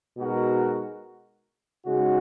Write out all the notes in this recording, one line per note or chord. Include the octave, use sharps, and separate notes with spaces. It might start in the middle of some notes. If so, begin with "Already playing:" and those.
B2 G#3 D#4 F#4 A#4
C#3 G#3 D#4 F#4